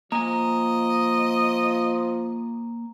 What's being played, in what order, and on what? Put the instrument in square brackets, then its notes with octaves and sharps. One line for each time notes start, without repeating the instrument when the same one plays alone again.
[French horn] F3 [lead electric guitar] A#3 G#5 [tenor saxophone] D#5 [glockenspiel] A#5